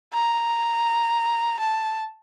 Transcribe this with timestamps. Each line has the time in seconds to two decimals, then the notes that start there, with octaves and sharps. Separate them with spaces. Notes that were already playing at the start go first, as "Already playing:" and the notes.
0.14 A#5
1.59 A5